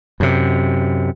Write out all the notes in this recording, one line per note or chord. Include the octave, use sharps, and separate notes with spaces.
F#2 C3